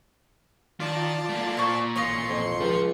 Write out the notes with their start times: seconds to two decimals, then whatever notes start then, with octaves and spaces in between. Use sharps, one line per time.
0.80 D#3 F4 D5 A5
1.29 A3 A#3
1.57 A#2 C5 C#6
1.96 A1 D#4 F4 C#5 C6 C#7
2.29 F2
2.60 C#2 F3